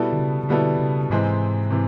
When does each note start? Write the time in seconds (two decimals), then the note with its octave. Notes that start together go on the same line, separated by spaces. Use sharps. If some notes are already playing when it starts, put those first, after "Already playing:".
Already playing: B2 G3 B3 E4 A4
0.13 D3
0.19 C#3
0.43 C#3
0.49 B2 D3 G3 B3 E4 A4
0.80 C#3
1.10 G#2 C3 E3 G#3 C4
1.70 C3 E3